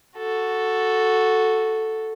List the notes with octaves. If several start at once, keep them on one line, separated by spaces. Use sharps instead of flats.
F#4 A4